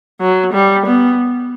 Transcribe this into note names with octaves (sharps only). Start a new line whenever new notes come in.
F#3
G3
B3